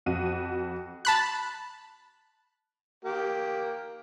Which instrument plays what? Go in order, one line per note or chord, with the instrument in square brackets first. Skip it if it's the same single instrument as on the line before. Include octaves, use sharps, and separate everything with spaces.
[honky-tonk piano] F2 F#4 D#7
[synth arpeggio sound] A5 B5 F#6
[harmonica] A#3 G4